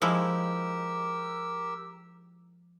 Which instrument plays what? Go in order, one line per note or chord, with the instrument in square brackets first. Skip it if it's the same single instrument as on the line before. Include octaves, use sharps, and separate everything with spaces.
[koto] F3 G#3 E4 [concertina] G4 A#4 E6